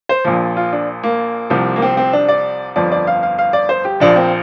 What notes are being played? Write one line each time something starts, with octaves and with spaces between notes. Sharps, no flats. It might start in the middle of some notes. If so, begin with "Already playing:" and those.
C5
A#1 A#2 F3
F4
D4
A#3
C2 C3 F3
A#3
C4
C4
D4
D5
G1 F2 F3 D5
D5
F5
F5
F5
D5
C5
G4
A#1 A#2 F3 D4
C4